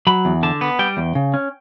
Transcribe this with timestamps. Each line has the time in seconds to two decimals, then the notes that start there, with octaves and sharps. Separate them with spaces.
0.07 F#3 B5
0.25 E2
0.43 D3 A5
0.61 B3
0.79 G3 G5
0.97 E2
1.15 C#3
1.34 C#4